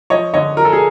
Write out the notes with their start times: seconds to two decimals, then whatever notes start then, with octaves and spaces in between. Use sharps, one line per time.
0.10 F3 C#5 D#5
0.34 D3 C#5 D#5
0.57 F3 A#4
0.65 A4
0.72 G#4 A#4